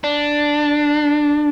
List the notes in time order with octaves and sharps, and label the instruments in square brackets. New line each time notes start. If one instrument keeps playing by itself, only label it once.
[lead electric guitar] D4